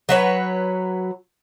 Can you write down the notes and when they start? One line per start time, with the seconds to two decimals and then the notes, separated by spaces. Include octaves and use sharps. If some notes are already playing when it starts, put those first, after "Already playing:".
0.09 F#3 B4 C#5